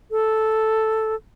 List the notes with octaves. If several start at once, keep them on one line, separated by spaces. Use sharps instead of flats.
A4